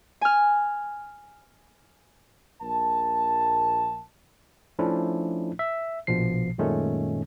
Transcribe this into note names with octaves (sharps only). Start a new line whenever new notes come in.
G#5 F6
A#1 A#4 A5
F3 A3 C#4 D4 E4
E5
A#1 B2 F3 C7
F#2 A#2 D#3 G#3 A3 C#4